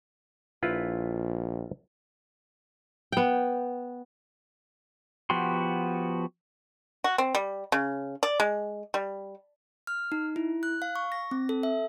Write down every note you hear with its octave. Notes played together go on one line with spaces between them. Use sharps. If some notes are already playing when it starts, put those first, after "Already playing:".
A#1 E4 F4 B4
B3 G5
F3 B3 F#4 G4 C6
F#4
C4
G3
C#3
D5
G#3
G3
F6
D#4
E4
F#6
F5
C#6
A#6
C4
A4
E5